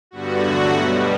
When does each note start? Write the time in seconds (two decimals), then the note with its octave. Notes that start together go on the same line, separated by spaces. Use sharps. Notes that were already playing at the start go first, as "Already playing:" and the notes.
0.11 G2 D3 G3 B3 F#4
0.40 E2 D3 F#3 A3
0.70 B2 G3 B3